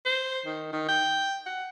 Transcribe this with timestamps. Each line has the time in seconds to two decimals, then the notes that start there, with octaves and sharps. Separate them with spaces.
0.05 C5
0.46 D#3
0.73 D#3
0.89 G5
1.46 F#5